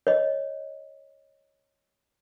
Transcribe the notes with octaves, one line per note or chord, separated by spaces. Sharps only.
C#5 D#5